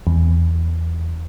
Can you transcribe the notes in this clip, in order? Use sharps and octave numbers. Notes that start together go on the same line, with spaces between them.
E2